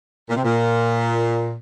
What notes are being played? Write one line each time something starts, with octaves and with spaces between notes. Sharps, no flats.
A#2
C3
A#2